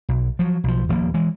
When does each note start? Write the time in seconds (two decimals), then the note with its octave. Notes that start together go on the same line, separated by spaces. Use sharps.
0.09 B1
0.39 F3 F#3
0.64 B1 F3
0.89 D#1 F3 A#3
1.14 E3 G#3